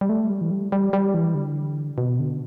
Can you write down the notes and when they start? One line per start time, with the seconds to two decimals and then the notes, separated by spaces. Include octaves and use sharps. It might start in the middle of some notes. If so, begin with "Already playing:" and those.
0.01 G3
0.09 A3
0.30 G3
0.41 E3
0.51 G3
0.72 G3
0.93 G3
1.14 E3
1.34 D3
1.98 B2
2.20 D3